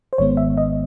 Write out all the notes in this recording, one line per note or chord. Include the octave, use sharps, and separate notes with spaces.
C5
G#1 G#2 D#3 G#3 B3 C#5
E5
D#5